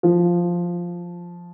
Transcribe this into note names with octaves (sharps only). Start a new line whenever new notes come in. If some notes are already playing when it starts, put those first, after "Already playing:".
F3